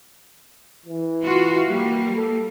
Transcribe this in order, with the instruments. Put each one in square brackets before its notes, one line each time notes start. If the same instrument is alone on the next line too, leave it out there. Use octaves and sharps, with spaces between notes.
[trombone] E3
[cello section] F4 F#4
[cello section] G3 A#3 [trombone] G4
[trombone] A4